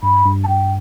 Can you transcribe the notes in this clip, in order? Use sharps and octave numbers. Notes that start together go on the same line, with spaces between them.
G2 B5
G2
A5
G2 G5